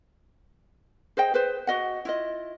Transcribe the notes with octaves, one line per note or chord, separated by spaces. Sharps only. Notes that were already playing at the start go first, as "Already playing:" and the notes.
G#4 C5 D#5 G5
G#4 B4 C5
F#4 D#5 F#5
E4 F4 D#5